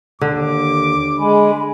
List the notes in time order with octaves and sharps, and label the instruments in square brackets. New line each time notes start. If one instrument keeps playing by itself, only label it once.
[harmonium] D#2 [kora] D3 [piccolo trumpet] D6
[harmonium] G#3 [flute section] G#5 B5